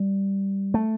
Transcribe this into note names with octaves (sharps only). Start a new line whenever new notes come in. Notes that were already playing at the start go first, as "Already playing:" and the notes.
Already playing: G3
A3